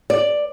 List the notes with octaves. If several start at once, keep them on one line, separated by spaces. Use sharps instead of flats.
D5